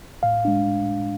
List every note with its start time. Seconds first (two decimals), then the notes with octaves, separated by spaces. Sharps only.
0.23 A2 F5
0.45 G#3 D4